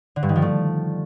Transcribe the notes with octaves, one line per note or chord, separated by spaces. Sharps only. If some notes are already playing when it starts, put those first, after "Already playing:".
D3
G2
D#3
F3
A3